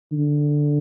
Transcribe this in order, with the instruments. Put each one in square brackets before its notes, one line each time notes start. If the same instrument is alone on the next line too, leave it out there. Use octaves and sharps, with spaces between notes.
[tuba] D3